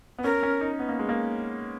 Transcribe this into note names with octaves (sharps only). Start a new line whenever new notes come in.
B3
C#4 A#4
C#4
D#4
B3
A#3
G#3
A#3